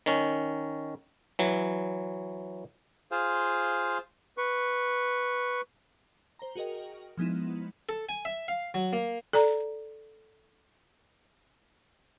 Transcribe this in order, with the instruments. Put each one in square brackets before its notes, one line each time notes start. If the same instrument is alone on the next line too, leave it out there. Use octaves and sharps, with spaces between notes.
[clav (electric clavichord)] D#3 C#4
E3 F#3
[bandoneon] F4 G#4 C5 F5
B4 C#6
[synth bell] C5 A#5
F#4 G#4 A#4 D#5 G5
F3 G#3 B3 D#4 E4
[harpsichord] A4
G#5
E5
F5
F#3
A#3
[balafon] A4 D5 A#5